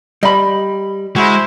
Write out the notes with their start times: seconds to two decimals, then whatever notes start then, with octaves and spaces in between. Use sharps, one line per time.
0.23 G3 D#5 B5
1.16 G#3 E4 F#4 C5